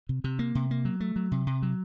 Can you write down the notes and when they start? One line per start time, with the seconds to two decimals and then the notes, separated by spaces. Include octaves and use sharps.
0.09 C3
0.24 C3
0.39 A#3
0.55 C3
0.71 A#3
0.85 F#3
1.00 A3
1.16 F#3
1.32 C3
1.46 C3
1.62 F#3